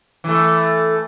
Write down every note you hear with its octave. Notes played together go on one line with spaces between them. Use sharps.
E3 A3